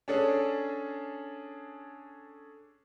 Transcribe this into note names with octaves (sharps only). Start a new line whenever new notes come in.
C#4 D4 G#4 A4